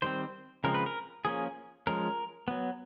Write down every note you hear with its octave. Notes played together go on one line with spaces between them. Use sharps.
D#3 G3 C4 C5
C#3 F3 G#3 C4 A#4
B4
A#4
F3 A#3 C#4 G#4
F3 G#3 C#4 A#4
F#3 B3